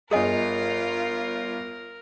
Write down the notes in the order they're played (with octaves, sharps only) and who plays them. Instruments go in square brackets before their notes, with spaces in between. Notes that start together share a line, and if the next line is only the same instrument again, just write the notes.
[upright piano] G1 D#6 [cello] F4 [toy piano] G#4 D#5 G#5 [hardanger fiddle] A#4